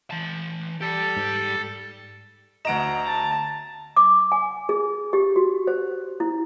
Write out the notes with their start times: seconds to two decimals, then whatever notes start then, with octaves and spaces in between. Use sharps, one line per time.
0.11 E3 A5
0.81 G4 A4 D5
1.16 G#2
2.65 D2 D#5 F#5 A#5 D7 E7
3.06 A5
3.97 D6
4.32 G#5
4.69 G#4
5.13 G4
5.36 F#4
5.67 C5
6.20 E4